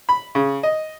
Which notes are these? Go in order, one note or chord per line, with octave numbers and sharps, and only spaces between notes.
B5
C#3
D#5